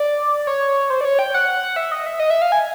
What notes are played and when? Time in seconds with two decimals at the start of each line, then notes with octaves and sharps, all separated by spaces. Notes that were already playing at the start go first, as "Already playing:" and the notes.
Already playing: D5
0.47 C#5
0.90 C5
1.01 D5
1.05 C#5
1.19 G5
1.34 F#5
1.76 E5
1.92 D#5
2.06 E5
2.19 D#5
2.30 E5
2.42 F5
2.52 G#5